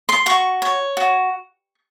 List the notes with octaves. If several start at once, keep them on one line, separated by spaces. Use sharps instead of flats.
C6
F#4 C#6
C#5
F#4